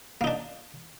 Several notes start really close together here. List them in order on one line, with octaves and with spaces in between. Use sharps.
A#3 D#4 D4